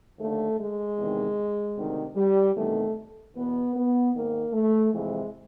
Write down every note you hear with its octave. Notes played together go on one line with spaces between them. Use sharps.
D#2 D3 A3
G#3
E2 C3 D#3
D2 C3 D#3
G3
E2 C3 D#3 A3
E2 B2 B3
B3
G#2 D#3 A#3
A3
F2 C3 E3 G#3